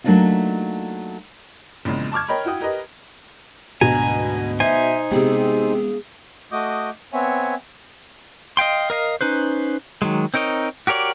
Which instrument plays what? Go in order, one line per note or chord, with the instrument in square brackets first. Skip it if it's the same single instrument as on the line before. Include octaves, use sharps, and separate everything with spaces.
[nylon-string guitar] F#3 A3 A#3 D4 D#4 F4
[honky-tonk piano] A#1 E2 C#3 G#3
A5 C#6 D6 F6 G#6
A#4 C#5 D#5 G5 B5
E4 F#4 G5 D#6
G4 A#4 B4 D#5
[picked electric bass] D2 G#2 D4 [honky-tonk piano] B2 [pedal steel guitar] G#5 A#5
[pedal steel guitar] D#4 C5 G#5 [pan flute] E5
[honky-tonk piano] C3 G4 [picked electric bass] G#3 B3 [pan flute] G#4
[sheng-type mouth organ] A3 F#4 D#5 D6 D#6 G6
B3 C4 C#5 E5 G#5
[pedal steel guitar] D#5 F5 G5 C6
A#4 D#5 F5
C#4 D#4 B4 C5
D#3 F#3 G#3
C4 D#4 A#4 C#5 D#5
F#4 G4 A#4 C#5 D5